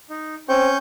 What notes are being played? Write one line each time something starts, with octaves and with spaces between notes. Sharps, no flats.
D#4
C4 C#4 C#6 G6